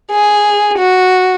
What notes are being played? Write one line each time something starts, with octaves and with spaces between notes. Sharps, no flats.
G#4
F#4